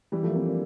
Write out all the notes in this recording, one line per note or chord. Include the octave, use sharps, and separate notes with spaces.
E3 G3
F3 A3
A#3
A3 C4
A#3 D4